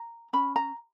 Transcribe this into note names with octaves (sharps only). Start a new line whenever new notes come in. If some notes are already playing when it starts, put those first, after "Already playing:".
Already playing: A#5
C#4 B5
A#5